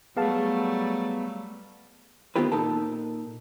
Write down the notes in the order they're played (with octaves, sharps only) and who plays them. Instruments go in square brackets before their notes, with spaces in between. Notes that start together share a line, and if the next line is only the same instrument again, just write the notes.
[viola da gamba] F#3 G3 A3 [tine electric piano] B3 F5 A5 [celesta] G#4
[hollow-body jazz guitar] D#3 B3 C4 F4 G4 B4
A#2 D#4 A4 A#4 A5